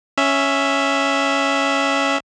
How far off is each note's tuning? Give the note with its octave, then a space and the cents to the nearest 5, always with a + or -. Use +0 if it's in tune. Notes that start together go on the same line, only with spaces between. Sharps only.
C#4 +0 E5 +0